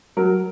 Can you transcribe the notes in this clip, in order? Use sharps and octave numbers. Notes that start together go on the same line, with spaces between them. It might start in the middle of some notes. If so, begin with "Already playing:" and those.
F#3 A#4